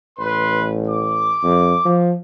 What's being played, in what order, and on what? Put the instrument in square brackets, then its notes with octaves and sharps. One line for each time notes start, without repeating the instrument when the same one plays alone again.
[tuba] A1 [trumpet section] B4 C6
[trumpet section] D6
[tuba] F2
F3